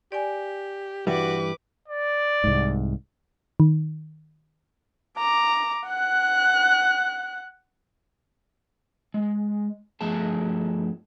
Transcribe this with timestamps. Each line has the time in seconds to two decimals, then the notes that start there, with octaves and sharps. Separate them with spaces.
0.12 G4 D5 G#5
1.07 G2 E3 G3 F#4 B4 D6
1.88 D5
2.44 C2 G#2
3.60 D#3
5.18 A#5 D6
5.87 F#5 F#6
9.14 G#3
10.01 G2 F3 A3 G#4 A5